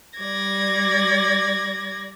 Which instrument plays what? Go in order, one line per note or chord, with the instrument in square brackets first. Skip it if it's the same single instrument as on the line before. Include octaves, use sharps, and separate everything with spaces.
[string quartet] G3 D5 G#6 A#6